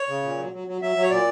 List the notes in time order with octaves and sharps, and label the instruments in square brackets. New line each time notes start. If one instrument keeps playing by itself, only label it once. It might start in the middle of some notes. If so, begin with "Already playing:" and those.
Already playing: [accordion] C#5
C#3
A#2
F#3
F#3
F#3
F#3 E5
F#3
C#5
A#2 D5